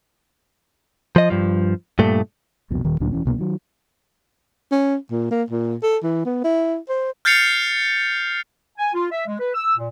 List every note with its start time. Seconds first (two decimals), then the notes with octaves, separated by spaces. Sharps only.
1.16 F3 D#5
1.30 G2 F3
1.99 G2 A#2 A3
2.70 C2 F2 B2
2.85 D#1 D#3
3.00 D2 A#2 F#3 D4
3.12 E1 E3 C#4
3.25 C2 B2 A#3
3.38 D#3 F#3
4.72 C#4
5.11 A#2
5.31 A#3
5.50 A#2
5.83 A4
6.03 E3
6.26 B3
6.44 E4
6.89 C5
7.25 F6 G6 A6 C7 C#7 F7
8.78 G#5
8.94 F4
9.12 E5
9.28 G#3
9.40 B4
9.54 E6
9.77 A#2